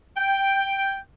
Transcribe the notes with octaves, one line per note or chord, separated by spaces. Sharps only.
G5